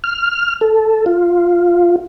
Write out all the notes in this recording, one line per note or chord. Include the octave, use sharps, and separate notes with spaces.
F6
A4
F4